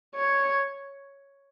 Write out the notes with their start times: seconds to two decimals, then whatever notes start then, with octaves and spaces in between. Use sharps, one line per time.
0.15 C#5